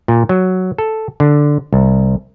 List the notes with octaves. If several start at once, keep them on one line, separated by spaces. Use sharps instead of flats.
A#2
F#3
A4
D3
C2